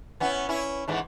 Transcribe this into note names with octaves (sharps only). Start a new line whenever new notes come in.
B3 C#4 E4
C#4 E4
G#2 E3 A3